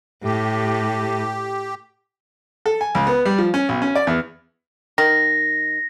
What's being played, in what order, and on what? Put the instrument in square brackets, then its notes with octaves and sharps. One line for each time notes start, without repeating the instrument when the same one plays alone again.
[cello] A2 [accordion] G4
[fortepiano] A4
G#5
C#2
B3
G3
F3
C#4
B1
C#4
D5
E2
[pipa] D#3 [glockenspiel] A#6